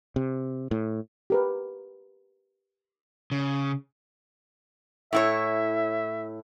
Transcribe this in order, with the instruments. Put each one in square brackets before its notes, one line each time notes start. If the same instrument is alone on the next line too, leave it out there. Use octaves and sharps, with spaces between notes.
[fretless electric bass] C3
A2
[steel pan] G4 A#4 B4
[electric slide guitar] C#3
[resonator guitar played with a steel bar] A2 E4 C#5 [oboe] E5